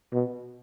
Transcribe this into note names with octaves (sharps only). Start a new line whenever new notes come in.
B2